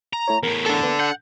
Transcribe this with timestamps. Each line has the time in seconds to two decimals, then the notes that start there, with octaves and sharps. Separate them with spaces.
0.13 A#5
0.28 A3 E4 C#5
0.43 E2 A2 A#4
0.66 D4 A4
0.83 A#3 B3 B4
1.00 F#5 G6